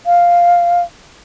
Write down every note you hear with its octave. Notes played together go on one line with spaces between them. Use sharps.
F5